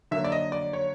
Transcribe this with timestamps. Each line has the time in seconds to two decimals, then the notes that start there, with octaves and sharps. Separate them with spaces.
0.11 D3 F#3 A#3 E5
0.24 D5
0.32 D#5
0.52 D5
0.73 C#5